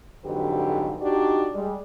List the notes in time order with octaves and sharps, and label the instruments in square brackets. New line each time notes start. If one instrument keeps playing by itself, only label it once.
[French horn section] F2 G#2 D3 F#3 G4 B4
D4 D#4 F#4 G4
G3 G#3